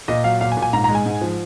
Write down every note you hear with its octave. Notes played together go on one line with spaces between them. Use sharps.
A#2 D#5
F#3 F5
A#2 F5
G#5
A#2
G#5
G#2 A#5
A#5
G#3
G#5
G#2
F3